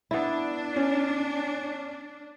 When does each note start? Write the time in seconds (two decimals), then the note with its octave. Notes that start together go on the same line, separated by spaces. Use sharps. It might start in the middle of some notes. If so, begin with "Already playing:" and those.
0.11 B3 D4 E4
0.76 C#4